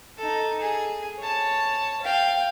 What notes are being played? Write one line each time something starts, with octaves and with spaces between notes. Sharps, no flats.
D#4 A4
G#4
C#5 A5
F5 G5